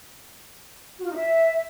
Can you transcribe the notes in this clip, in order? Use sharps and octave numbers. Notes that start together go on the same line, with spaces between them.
F#4
F4
D#4
E5